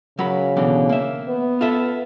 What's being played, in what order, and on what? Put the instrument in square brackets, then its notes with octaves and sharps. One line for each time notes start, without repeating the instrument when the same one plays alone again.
[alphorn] C#3 [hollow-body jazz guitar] F#3 A#4 B5
[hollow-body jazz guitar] B2 D3 E3
A#3 E5
[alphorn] B3
[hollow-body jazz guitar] F4 A4 E5